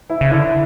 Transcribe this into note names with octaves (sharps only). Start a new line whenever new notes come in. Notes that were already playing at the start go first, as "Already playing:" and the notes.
E4
C#3
D3 E4